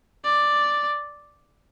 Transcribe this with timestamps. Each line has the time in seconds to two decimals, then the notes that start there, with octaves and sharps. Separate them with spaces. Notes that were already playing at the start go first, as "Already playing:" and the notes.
0.24 D5